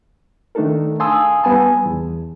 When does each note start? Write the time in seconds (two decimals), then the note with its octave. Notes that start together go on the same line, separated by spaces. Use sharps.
0.55 D#3 A3 D4 D#4 A4 A#4
1.00 F5 G#5 A5 C6 D#6 E6
1.44 G3 B3 G#5 A5
1.86 E2